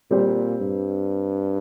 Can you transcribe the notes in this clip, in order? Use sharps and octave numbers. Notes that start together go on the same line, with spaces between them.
A#2 G3 C4 G4 C5
G2